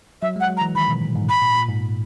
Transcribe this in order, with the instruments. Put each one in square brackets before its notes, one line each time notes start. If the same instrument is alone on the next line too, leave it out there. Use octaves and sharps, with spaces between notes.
[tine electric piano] F#3 [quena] E5
[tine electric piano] G#3
[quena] F#5
[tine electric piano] F#3
[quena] A#5
[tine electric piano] E3
[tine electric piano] D#3 [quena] B5
[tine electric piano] B2
A#2
G#2
[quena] B5
[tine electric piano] A#2
A#2
G#2